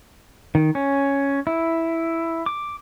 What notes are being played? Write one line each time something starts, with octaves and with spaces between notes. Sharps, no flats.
D#3
C#4
E4
D6